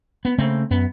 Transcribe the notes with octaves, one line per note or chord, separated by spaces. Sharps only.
B3
C#3 A3 A#3 C4
F#2 B3